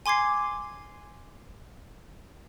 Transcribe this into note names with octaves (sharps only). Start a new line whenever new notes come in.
G#5 C6 D6 G#6 C7